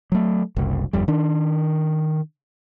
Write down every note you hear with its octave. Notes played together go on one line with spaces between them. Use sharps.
F#3 A3
F#1 C2
G1 F2 G3
D#3 D4